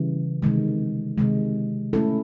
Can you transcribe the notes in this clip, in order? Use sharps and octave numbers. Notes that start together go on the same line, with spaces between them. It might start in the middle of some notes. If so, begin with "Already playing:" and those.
Already playing: C#3 E3 G3
C3 D#3 G#3
C3 D#3 G#3
A3 C#4 E4 A4